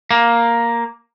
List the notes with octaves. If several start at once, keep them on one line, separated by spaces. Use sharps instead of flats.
A#3